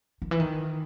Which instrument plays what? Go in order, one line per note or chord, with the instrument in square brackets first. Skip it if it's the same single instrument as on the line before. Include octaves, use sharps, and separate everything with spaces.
[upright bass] D#3
E3
D#3